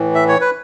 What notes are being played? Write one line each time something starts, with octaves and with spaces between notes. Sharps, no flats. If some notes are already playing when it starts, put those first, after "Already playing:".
Already playing: A2 E3
E5
C#5
B4